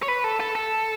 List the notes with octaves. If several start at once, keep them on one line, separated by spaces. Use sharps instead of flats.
C#5
B4
A4
A4
A4